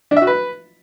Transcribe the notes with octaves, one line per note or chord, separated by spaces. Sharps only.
D4
E5
F#4
B4